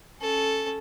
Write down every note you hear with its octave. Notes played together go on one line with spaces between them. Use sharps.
C#4 A4